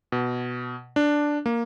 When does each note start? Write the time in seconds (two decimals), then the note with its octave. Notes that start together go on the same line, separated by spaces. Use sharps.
0.12 B2
0.96 D4
1.46 A#3